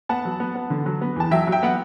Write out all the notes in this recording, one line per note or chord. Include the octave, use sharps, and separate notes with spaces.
B3 F#5 A5
F#3
B3
B3
D3
F#3
B3
E2 A5
F#3 E5 G5
F#3
E5 G5
B3 F#5